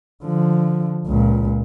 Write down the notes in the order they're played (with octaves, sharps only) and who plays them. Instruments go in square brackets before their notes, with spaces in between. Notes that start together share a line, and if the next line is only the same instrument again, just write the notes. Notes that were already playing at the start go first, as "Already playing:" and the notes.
[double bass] D3 F3
C#2 A#2